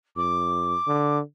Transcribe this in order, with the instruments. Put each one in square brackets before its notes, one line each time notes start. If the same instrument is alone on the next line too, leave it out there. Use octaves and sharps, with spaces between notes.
[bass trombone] F2 [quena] D6
[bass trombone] D3